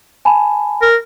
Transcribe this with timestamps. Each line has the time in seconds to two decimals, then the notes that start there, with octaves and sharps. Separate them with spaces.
0.25 G#5 A5 B5
0.82 A#4